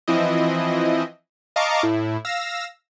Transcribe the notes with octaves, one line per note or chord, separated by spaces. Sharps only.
E3 F3 C4 E4 D#5
D#5 F5 A5 A#5 C#6 D6
A2 E4
F5 E6 A#6